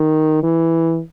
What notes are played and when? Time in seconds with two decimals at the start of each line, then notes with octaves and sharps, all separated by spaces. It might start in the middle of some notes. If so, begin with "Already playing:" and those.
Already playing: D#3
0.43 E3